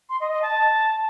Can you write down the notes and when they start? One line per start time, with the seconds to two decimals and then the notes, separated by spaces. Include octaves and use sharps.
0.09 C6
0.20 D#5
0.31 D#5
0.42 A5